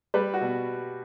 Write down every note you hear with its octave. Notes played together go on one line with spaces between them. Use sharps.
G3 B4
F#4
B2